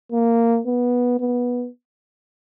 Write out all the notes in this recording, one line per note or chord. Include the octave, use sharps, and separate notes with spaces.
A#3
B3
B3